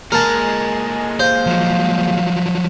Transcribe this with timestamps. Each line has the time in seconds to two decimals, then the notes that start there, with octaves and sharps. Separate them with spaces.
0.12 A#2 G#3 A#4 G#5 A5
1.20 C5 F5
1.46 F3 F#3